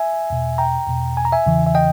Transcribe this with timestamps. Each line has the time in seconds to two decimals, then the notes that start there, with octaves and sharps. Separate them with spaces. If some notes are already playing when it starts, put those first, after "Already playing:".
Already playing: E5 G#5
0.30 E2 B2
0.58 G5 A#5
0.88 E2 B2
1.17 G#5
1.25 A#5
1.32 E5 G#5
1.46 E2 C#3 E3
1.67 E5
1.75 D#5 G5